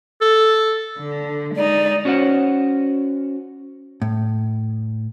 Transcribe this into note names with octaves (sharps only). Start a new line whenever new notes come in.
A4
D3
G#3 D#4 D5
C#4 F#4 C5 C#5 F#5
A2